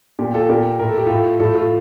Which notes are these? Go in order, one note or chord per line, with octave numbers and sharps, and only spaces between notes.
A#2 G4
F4 A4
A#2 G4 A#4
A2 A#4
A4
G4
A2 F4 A4
A2 F4 A4
F4 A4